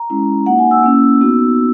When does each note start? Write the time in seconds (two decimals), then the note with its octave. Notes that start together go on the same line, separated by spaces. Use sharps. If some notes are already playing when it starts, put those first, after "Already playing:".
Already playing: A#5
0.10 G#3 C#4 E4
0.46 A#3 D#4 F#4 F#5
0.59 G#5
0.71 E6
0.84 A#3 C#4 E4
1.21 B3 D#4 F#4